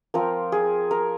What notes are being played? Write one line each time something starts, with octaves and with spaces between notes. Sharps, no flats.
F3 C4 F4 A#4
G#4
A#4